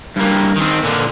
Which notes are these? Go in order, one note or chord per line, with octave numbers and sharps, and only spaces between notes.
G2 A#3
D#3 C4
A#2 D3